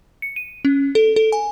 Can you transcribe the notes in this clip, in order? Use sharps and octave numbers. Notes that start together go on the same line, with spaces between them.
C#7
D#7
C#4
A4
A4
G#5